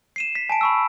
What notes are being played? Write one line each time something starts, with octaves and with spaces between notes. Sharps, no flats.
C7 D#7 E7
B6
G#5 A5 D7
B5 C#6 E6